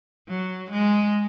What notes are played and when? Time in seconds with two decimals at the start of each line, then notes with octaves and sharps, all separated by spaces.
0.28 F#3
0.70 G#3